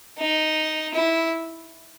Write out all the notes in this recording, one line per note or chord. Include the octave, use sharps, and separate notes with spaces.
D#4
E4